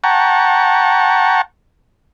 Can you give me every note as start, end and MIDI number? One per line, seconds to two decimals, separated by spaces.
0.04 1.41 78
0.04 1.41 79
0.04 1.41 81
0.04 1.41 82
0.04 1.41 85